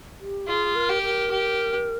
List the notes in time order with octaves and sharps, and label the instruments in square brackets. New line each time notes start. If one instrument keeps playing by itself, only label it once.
[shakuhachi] G4
[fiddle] F4 [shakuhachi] G#4
[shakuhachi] A#4
[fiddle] G4
[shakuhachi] A#4
[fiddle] G4